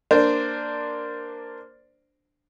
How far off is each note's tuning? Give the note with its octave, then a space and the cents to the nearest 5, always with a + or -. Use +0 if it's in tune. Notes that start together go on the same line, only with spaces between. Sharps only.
A#3 +0 D4 +5 C5 -10